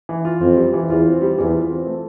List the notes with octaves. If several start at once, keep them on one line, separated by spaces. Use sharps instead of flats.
E3
F4
F2 C4
G3
E3
E2 F4
C4
G3
E2 E3
F4
C4
A3